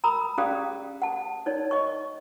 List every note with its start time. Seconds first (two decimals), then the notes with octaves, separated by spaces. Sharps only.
0.04 A#5 B5 D#6 E6
0.38 C#4 G4 G#4 D5 F5 D#6
1.02 F#5 A5
1.46 D#4 C#5 D5
1.71 D#5 C#6